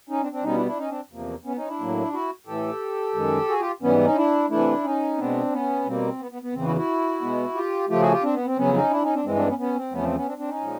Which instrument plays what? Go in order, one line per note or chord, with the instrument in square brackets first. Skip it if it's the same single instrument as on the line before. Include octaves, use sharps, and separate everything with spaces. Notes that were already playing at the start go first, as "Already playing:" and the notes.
[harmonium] C#4 D#4
C4 D4
C4 D4
B2 G3 B3 C#4 D#4
D4 E4
D4 E4
C#4 D#4
C4 D4
E2 C3 F3 A#3
B3 C#4
C#4 D#4
D4 E4
A2 F#3 A#3
E4 F#4
A2 E3 A3 G4 A4
F#2 D#3 G#3
F#4 G#4
F4 G4
G#2 E3 G3 B3 C#4
C#4 D#4
D4 E4
C3 E3 A3 D4 E4
C#4 D#4
B2 G#3 B3 C4 D4
B3 C#4
B2 G3 A#3 C4
B3
B3
B3
E2 C#3 E3 C4
E4 F#4
E4 F#4
B2 G#3 B3
F4 G4
C#3 F3 A3 F4 G4
F#4 G#4
F4 G4
C4 D4
B3
C4
F2 C#3 F#3 B3 C#4
C#4 D#4
D4 E4
C#4 D#4
C4 D4
G2 E3 G#3 C4
C4 D4
B3 C#4
B3 C#4
C4
E2 C#3 F3 A3 B3 C#4
C4
B3 C#4
C4 D4
C4 D4
C#4 D#4
A#2 F3 G#3